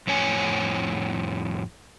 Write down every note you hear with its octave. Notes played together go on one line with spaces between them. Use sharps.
F2 A2 C#5 G#5